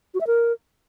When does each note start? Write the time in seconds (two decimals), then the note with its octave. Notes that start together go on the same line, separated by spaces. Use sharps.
0.14 F#4
0.21 E5
0.27 A#4